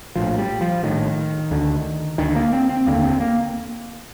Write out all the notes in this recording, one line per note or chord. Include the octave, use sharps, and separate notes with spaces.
A#1 A2 F3
G3
F3
A#1 A2 D#3
D2 D3
D2 D3 D#3
A#3
C4
C4
F1 D#2 D3 A#3
C4
A#3